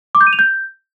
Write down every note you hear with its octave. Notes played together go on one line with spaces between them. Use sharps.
D6
G6
D#7
F7
G6